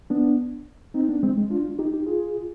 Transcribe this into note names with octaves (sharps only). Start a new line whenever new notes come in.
B3 D4
C4 D#4
B3 D4
G#3 C4
G#3
D4 F4
D4 F4
D#4 G4
D#4 G4
F4 G#4